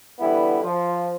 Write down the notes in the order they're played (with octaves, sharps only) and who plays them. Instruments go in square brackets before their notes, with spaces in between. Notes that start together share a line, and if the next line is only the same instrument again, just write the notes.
[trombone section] D3 E3 G3 B3 E4
F3